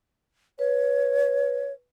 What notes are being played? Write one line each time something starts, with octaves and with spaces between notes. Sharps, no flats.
B4 C#5